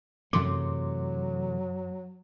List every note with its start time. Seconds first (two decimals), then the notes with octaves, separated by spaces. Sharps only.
0.33 F#2 C3 E3 F#3 A3 C6 D6